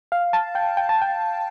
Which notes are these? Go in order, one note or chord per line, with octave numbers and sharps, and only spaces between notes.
F5
A5
G5
G5
A5
G5